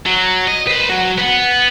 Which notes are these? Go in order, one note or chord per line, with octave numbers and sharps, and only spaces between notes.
F#3
D#5
B4 C5
F#3 F#4
B3 F#5